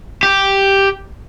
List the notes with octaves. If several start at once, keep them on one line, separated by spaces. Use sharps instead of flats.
G4